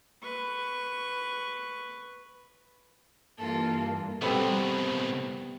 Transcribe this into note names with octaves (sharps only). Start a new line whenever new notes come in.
B4 C#6
G2 E3 A#3 F4 A4
C2 B2 G3 A3 B3 C4 B5